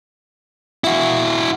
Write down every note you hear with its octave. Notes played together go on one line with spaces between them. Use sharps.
E4 F#4